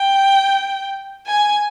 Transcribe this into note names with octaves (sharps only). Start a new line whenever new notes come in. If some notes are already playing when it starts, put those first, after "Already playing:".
Already playing: G5
G#5